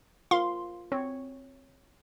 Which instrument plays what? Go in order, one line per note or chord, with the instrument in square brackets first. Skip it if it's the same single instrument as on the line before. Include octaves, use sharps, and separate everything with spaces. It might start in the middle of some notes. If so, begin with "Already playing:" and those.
[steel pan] F4 A#4 [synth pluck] F5 C6
[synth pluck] C4 [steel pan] C#5